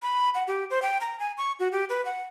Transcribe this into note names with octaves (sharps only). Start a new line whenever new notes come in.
B5
F#5
G4
C5
G5
A#5
G#5
C#6
F#4
G4
B4
F#5